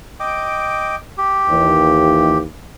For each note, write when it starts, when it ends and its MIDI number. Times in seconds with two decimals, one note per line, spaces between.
0.20 0.96 75
0.20 0.96 79
0.20 0.96 86
1.17 2.38 67
1.49 2.43 39
1.49 2.43 52